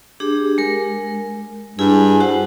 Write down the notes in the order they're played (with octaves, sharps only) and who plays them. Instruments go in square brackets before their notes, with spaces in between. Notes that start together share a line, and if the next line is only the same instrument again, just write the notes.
[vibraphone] D4 G4 G#4
G#3 A#4
[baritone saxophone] G2 [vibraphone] E4 G#4 G#5
[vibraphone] F#4 C5 F#5